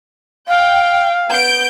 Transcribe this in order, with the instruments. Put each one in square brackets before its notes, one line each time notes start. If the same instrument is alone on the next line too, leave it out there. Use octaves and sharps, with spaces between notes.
[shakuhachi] F5 [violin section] G5
[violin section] B3 G6 D7